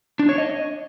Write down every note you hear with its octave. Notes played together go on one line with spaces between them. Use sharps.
D4
C#5
D#5